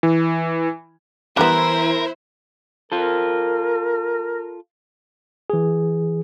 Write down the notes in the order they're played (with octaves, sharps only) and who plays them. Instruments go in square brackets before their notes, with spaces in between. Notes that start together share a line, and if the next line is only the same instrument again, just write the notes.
[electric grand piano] E3
[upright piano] E3 A#5 F#6 [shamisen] G3 B3 [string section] E4 C5 [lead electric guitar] A#4
[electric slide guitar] F4 A4 [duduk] A#4
[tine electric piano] E3 G#4